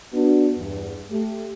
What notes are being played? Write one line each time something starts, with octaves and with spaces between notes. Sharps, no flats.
B3 D4 F#4
E2 G2
A3 G4